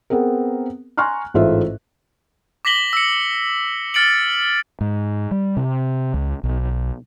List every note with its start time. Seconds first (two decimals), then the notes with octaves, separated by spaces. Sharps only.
0.10 B3 C4 G#4 A#4
0.98 G#5 A#5 C6 C#6 F6 F#6
1.34 A1 G#2 A3 F4 C5 E5
2.65 D6 A#6 B6 F#7 G7
2.93 E6 C#7
3.94 F6 A6 C#7 D7 F#7
4.81 G#2
5.31 G3
5.57 C3
6.14 C#2
6.44 B1